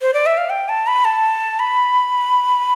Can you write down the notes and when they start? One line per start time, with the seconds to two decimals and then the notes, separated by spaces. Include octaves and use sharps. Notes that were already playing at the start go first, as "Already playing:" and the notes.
0.02 C5
0.14 D5
0.26 E5
0.37 F5
0.50 G5
0.69 A5
0.87 B5
1.05 A5
1.59 B5